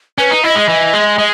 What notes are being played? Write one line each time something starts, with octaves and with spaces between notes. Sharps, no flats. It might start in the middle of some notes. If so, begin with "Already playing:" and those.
C#4 B4
D#4
E4 D#5
G#3
E3
G#3
G#3